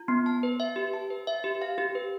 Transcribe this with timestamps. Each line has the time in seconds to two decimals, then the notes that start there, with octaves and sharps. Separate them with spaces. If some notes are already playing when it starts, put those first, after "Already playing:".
Already playing: F4
0.08 B3
0.26 A5
0.43 B4
0.60 E5
0.76 G4
0.93 A5
1.10 B4
1.27 E5
1.44 G4
1.62 F5
1.78 G4
1.95 B4